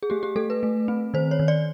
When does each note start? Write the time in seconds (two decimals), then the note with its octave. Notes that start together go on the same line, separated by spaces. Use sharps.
0.03 G#4
0.10 A3 G4
0.23 G4
0.36 A3 A4
0.50 B4
0.63 A3
0.88 C4
1.14 D#3 C5
1.31 C#5
1.39 D#3
1.48 D5